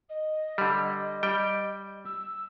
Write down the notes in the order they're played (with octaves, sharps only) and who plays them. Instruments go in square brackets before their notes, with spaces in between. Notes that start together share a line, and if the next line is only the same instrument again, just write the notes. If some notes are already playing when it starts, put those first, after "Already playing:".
[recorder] D#5
[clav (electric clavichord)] D3 G3
G3 G5
[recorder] E6